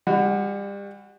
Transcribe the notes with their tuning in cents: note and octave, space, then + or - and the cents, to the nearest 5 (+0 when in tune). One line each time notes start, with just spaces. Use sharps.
G3 +35 F#4 -5